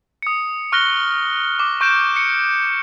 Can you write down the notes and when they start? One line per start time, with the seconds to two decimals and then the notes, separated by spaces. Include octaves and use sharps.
0.22 D#6 C#7
0.72 C#6 F6 F#6 A#6 G7
1.59 D6
1.81 C#6 G6 D7 E7
2.16 C#7